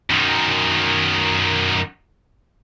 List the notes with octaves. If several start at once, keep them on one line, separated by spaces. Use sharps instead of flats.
F#2 D#3